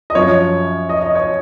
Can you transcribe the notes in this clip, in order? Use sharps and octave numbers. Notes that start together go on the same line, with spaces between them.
D#5
F#2 F3 C#5
D#5
D#5
C#5